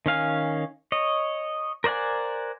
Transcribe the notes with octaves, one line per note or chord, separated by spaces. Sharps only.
D#3 C#4 F5 G#5
C#5 D#5
A#4 C5 D5 F#5 G#5